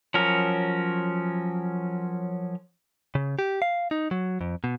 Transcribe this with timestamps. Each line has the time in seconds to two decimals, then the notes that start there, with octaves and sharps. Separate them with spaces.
0.14 F3 F#3 C#4 A#4
3.15 C#3
3.39 G4
3.62 F5
3.91 D#4
4.11 F#3
4.41 F2
4.64 B2